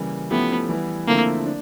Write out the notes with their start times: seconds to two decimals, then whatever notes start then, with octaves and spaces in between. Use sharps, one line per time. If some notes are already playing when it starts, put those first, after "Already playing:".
Already playing: C#3 E3 G3 A#3
0.31 F3 A3 B3 C#4 E4 G4
0.69 E3 G3 B3 E4
1.08 D3 F3 A3 A#3 C4 E4
1.46 D4